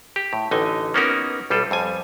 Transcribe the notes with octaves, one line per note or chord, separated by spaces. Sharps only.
G4
A2
A1 D3 D#4 D#5 G#5
A#3 B3 C#4 D#4 F#4 A#4
B1 G3 F4 A4
F2 G3 G#5